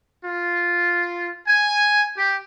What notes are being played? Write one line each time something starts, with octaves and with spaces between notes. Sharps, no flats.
F4
G#5
G4